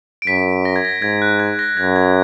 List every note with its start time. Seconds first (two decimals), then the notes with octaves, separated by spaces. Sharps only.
0.22 D7
0.27 F#2 B6
0.65 A#6
0.76 G#6
0.85 A#6
1.02 G#2 G#6
1.22 F#6
1.40 G#6
1.59 A#6
1.77 F#2 G#6
1.96 G#6